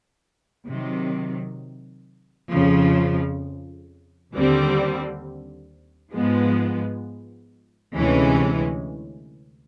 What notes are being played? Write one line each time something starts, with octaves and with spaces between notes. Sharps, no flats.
C3 D#3 F#3
F2 C#3 F3
D#2 D3 G3 C4
G#2 F3 G#3 B3
D2 C3 E3 G#3 C#4